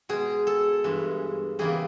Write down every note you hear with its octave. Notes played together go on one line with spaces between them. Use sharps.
B2 G#3 G#4
A4
G2 E3 G#3
E2 C#3 E3 G3 A#3 G#4